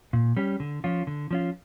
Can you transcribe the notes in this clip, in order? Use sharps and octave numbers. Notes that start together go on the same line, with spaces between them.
A#2
G3 C#4 G4
D3
F3 C#4 F4
D3
F3 C#4 F4